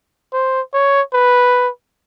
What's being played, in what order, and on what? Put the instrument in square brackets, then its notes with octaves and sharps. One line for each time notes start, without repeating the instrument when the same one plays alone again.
[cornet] C5
C#5
B4